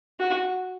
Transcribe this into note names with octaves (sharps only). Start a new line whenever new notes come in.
F#4